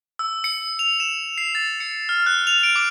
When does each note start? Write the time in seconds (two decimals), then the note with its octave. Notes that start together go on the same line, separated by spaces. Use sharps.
0.19 E6
0.44 C#7
0.79 F7
1.00 E7
1.38 C7
1.55 A6
1.80 C#7
2.09 F6
2.26 F#6
2.47 F7
2.63 D7
2.76 D6